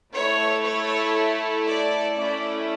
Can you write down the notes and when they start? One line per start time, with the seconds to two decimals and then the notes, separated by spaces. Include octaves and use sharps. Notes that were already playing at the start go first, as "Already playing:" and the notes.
0.13 A3 E4 A4 C#5
0.64 C#5
1.66 D5
2.18 A3 C#4 E4 D5